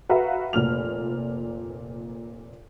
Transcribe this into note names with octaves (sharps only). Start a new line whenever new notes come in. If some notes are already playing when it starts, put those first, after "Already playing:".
F#4 B4 E5 F5 A#5
F1 A#2 F6 F7